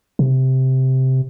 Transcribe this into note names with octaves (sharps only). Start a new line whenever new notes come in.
C3